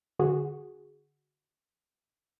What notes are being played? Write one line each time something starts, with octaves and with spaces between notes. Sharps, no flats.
D3 F#4 G#4